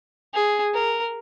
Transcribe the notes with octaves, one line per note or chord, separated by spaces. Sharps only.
G#4
A#4